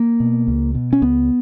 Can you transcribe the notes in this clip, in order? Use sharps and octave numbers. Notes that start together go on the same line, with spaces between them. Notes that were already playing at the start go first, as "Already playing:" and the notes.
Already playing: A#3
B2
C#2
B2
C#4
C#2 B3